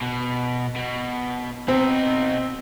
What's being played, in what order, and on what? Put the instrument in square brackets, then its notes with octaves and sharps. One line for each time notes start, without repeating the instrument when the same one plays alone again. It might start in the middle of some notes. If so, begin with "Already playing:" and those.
[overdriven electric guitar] B2
B2
[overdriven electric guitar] B2 D#4 [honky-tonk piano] C4